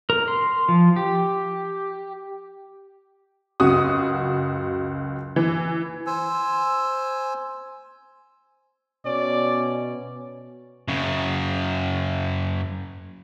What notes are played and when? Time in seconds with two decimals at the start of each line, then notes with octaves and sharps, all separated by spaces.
0.10 A#4
0.28 C6
0.68 F3
0.96 G4
3.60 C#2 F#2 F#4 D#6
5.36 E3
6.07 C5 G#5 E6
9.05 B2 C#4 D5
10.88 F#2 C#3